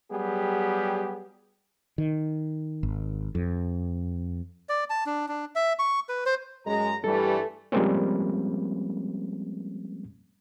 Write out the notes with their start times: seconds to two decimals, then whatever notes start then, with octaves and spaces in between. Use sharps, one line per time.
0.11 F#3 G3 B3 G4 G#4
1.98 D#3
2.83 G#1
3.35 F2
4.69 D5
4.90 A5
5.06 D4
5.28 D4
5.55 E5
5.79 C#6
6.09 B4
6.26 C5
6.66 F#2 G#3 A#5
7.04 G2 E3 G3 A3 A4
7.72 F3 G3 G#3 A#3 C4 C#4